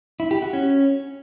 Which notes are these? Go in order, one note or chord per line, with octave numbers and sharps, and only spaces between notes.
E4
G4
F#4
C#4